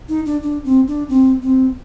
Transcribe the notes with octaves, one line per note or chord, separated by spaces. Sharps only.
D#4
D4
D4
C4
D4
C4
C4